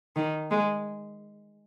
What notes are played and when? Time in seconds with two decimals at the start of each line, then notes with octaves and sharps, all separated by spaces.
0.16 D#3
0.51 G#3